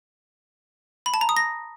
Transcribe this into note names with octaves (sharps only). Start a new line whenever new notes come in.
B5
A5
A#5
D#6
A#6